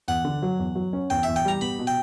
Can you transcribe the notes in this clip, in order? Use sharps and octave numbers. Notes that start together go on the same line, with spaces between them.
E2 F#5
D3
F#3
E2
F#3
C#4
E2 G5
E2 E5
G5
G3 A#5
B3 B5
B2
G5